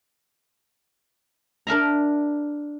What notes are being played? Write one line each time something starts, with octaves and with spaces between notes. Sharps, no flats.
D4 A#4 E5 A#5